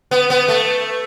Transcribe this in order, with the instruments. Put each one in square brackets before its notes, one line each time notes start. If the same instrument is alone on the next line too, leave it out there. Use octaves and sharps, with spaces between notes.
[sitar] B3
B3
A3